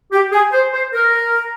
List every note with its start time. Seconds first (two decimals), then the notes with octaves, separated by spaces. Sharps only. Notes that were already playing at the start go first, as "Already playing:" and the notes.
0.12 G4
0.32 G#4
0.52 C5
0.73 C5
0.93 A#4